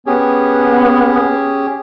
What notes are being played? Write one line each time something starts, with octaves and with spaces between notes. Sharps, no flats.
B3 C#4 G4 G#4